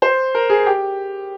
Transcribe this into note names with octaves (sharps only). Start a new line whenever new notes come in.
C5
A#4
G#4
G4